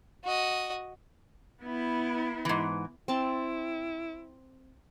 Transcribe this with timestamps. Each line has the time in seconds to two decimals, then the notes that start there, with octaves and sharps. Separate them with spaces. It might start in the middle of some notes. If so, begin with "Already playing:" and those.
0.24 F#4 D#5
1.62 B3 E4
2.45 G#2 E3
3.08 C4 E4 A5